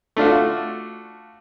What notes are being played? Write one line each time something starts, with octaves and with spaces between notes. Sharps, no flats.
A3 D4 F4 F#4